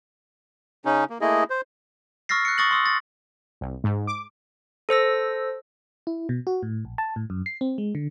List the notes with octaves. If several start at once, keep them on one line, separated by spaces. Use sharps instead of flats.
C#3 C#4 D#4
A#3
A3 A#3 E4 G#4 D#5
C5
C#6 E6 F6 A6 A#6 C7
F#6 C#7
C#6 D#6 A6 A#6 F#7
C6 D#6 E6
A6
C2
G#2
D6
A4 C5 E6 A#6
E4
B2
F#4
A2
A#1
A5
A2
F#2
C7
C4
G#3
D3